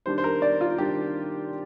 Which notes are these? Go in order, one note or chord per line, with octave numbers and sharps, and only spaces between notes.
D#3 G3 D4 C5
C5
A#4
D5
F4
D#3 G3 D4 G4